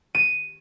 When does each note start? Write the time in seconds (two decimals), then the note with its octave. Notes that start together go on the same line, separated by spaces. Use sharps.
0.15 D#7